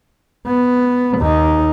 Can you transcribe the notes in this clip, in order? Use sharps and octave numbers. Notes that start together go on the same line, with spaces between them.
B3
D#2 D#4